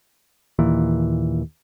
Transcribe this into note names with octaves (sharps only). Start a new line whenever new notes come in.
D#2 A#2 E3